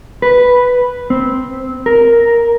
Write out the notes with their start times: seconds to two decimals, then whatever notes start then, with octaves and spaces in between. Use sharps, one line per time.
0.22 B4
1.10 C4
1.86 A#4